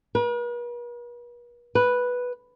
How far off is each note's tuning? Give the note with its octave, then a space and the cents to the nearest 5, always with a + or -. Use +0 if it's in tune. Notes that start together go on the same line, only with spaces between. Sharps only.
B4 -45
B4 -5